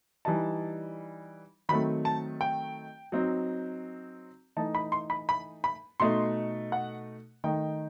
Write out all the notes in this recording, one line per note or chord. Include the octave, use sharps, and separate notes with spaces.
E3 G3 D#4 A5
D#3 F#3 A3 C4 B5
A5
G5
F#3 C4 D#4
E3 A3 D#4 A5
B5
C6
B5
B5
B5
B2 A3 D#4 C6
F#5
D#3 A3 D#4 G5